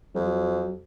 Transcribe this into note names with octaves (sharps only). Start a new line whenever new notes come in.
F2 F#3